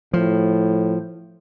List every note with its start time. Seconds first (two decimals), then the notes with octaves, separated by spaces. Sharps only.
0.13 A2 F3